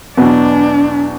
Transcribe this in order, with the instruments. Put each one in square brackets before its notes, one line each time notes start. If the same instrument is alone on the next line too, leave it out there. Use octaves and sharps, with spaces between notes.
[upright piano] E2 B2 F#3 B3 F#4 [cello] D4